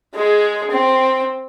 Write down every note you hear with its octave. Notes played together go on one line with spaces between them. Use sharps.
G#3 G#4
C4